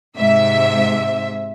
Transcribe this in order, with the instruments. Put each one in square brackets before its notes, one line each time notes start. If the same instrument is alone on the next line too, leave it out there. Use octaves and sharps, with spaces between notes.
[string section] G#2 C3 E5